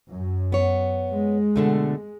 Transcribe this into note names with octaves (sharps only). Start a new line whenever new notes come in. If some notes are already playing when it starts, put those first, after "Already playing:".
F#2
B3 C#5
G#3
B2 D3 A3